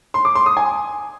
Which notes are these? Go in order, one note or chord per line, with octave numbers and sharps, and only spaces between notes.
C6
D6
C6
D#6
G#5